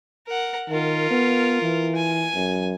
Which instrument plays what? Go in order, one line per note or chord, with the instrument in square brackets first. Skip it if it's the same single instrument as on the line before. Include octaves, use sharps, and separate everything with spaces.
[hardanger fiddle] A#4 F#5
[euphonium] D#3 [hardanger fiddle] F4 A#4
[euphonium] B3
E3
[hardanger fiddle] G#5
[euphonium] F#2